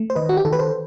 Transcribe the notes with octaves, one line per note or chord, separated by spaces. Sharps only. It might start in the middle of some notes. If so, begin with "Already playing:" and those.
Already playing: A3
C5
D#3 B4 D#5
F#4
G4
D#3 A4
B4
A4 C5